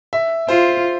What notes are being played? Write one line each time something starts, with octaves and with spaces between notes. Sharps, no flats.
E5
F4 C5